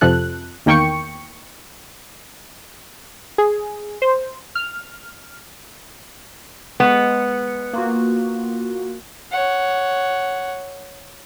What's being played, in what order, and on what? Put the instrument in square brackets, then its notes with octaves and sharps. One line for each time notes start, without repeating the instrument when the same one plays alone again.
[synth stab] F2 C3 F3 A4 F#6
E2 D#3 A#3 G5 C#6 C#7
G#4
C5
F6
[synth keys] G#3 C#7 [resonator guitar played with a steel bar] B3
[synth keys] A#3 F4 F#4
[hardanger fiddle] C#5 F#5